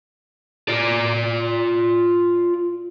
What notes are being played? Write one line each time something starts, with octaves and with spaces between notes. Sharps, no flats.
F4 D5